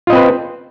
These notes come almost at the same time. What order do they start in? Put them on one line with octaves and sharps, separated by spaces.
F4 D#5 C4 B4 C5